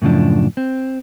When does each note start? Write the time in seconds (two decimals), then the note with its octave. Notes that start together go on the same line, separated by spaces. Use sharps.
0.02 F#2 A2 C#3 F3 D4
0.57 C4